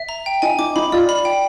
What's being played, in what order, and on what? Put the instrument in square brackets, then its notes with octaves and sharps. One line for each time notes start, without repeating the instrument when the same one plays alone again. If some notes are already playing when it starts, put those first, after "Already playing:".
Already playing: [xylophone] E5
A#5
G5
[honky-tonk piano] D#4 [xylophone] G#5
[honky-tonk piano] D#4 [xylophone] D6
[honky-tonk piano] D#4 [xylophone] B5
[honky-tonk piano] F4 [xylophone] D5
[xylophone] B5
G5